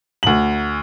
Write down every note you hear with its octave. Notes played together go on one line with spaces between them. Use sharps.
D2 F#7